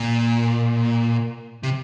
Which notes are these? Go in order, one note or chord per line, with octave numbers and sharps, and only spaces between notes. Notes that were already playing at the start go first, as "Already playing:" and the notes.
Already playing: A#2
C3